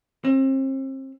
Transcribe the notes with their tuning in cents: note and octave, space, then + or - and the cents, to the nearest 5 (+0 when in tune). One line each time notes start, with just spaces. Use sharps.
C4 +35